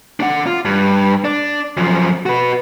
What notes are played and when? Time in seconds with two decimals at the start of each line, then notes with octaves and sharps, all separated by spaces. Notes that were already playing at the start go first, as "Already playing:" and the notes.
0.20 D4 F#5
0.47 F4
0.65 G2
1.24 D4
1.77 F#2 F3
2.26 F#4 B4